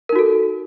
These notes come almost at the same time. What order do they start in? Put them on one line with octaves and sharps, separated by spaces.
A#4 D#4 F#4 A4